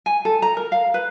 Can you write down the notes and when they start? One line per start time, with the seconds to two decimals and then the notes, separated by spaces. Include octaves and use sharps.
0.06 G#5
0.25 A4
0.42 A#5
0.57 A#4
0.72 F5
0.94 B4